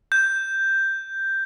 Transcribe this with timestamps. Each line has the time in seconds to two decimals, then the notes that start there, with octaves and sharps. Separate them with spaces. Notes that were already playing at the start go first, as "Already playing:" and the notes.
0.12 G6